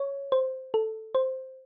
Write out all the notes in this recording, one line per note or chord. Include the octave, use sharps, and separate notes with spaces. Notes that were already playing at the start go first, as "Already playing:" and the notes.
Already playing: C#5
C5
A4
C5